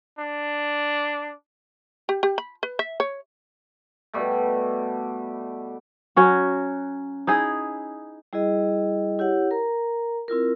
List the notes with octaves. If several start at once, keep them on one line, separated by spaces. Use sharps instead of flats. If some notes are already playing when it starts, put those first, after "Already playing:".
D4
G4
G4
B5
B4
E5
C#5
B2 G3 A3
F#3 C#4 F#4
D#4 E4 G#4
G3 E4 G#4 D#5 G5
E4 G4 C#5 F#5
A#4 A#5
C4 E4 F4 A#4